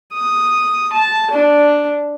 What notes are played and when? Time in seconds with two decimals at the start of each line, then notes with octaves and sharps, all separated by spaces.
0.13 D#6
0.93 A5
1.31 D4